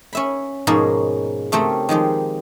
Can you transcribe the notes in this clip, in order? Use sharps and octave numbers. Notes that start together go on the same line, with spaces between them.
C#4 E5 B5
G#2 B2 F3 G#3 A#3 C#4
C#3 A3 C4 G4 A#4
D#3 F3 G#3 G4